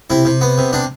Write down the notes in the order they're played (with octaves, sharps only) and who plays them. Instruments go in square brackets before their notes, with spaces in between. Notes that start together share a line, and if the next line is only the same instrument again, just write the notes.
[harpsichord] C3 E4
C3
B3
C3
C3 D4